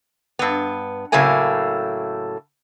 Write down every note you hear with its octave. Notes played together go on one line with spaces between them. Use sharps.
G2 B3
A2 C#3 F#3 A3 A#3 G#5